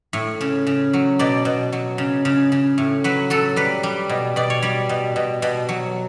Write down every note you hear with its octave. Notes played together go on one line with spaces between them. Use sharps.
A2
C#3
C#3
F#3
B2 D5
B2
F#3
C#3
C#3
C#3
A2
F#3 B4
F#3 A4
G3 B4
G3
B2
B2 D5
C#5
G3 D5
B2
B2
B2
F#3